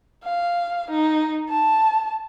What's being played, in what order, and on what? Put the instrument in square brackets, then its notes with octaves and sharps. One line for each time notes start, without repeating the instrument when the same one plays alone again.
[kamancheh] F5
D#4
A5